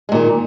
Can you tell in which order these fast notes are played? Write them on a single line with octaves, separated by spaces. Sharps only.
G#3 A#2 D#3